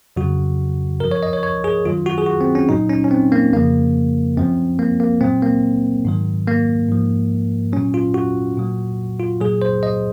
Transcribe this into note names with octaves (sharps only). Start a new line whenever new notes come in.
F2 C#3 F#3 F#4
F#2 F3 A#4
C#5
D#5
C#5
C#5
G#4
F#2 D#3 F#3 F4
F#4
G#4
F#4
C4
C#4
A#2 F#3 D#4
C#4
C#4
C4
A#3
F2 C#3 F3 A#3
F#2 F3 C4
A#3
A#3
A#2 F#3 C4
A#3
G#2 D#3 F#3
A#3
G#2 F3
A#2 F#3 C#4
F4
F#4
A#2 F#3
F4
A#2 F#3 G#4
C5
D#5